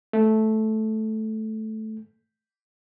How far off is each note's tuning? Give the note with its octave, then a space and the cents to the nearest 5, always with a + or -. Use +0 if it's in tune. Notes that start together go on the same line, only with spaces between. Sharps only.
A3 -10